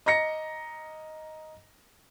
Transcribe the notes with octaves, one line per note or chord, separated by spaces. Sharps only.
D#5 A#5 A#6 C#7